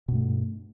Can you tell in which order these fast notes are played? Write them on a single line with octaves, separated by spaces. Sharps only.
B2 G2 A3